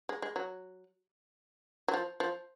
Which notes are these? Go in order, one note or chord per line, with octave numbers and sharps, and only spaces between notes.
G#3
G#3
F#3
F#3
F3
F3